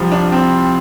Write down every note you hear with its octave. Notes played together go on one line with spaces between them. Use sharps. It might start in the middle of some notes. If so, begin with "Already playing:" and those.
Already playing: C2 C3 F3
D4
C4